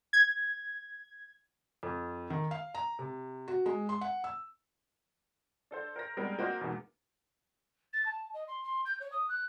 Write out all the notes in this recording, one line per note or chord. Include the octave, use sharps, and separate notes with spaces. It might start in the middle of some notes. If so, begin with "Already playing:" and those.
G#6
F2
D#3
F5
A#5
C3
F#4
G#3
C6
F#5
E6
D4 A4 C5
A#4 C5 A#6
G3 G#3 B3 C4 D4 A#4
A#3 C4 F#4 A#4 C5 D#5
E2 B2 G#3 A#3 D#4
A6
A5
D#5
C6
C6
G6
C#5
D#6
F#6